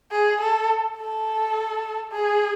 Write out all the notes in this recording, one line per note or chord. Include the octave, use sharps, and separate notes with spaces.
G#4
A4
A4
G#4